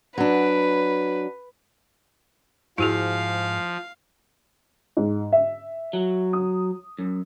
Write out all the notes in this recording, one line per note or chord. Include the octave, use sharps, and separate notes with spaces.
F#3 D4 B4
G#2 F3 E4 F#4 G#4 F5
G#2
E5
F#3
D#6
F#2